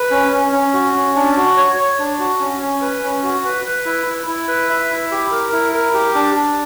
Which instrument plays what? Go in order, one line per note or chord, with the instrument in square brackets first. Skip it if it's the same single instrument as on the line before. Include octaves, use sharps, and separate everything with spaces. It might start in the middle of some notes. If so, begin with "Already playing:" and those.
Already playing: [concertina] B4
C#4
C#4
C#4
F#4
C#4
D4
F#4
C#5
C#5
D4
F#4
C#4
C#4
B4
C#4
F#4
B4
B4
E4
E4
E4
B4
E5
E4
G4
A#4
E4
A#4
G4
D4
D4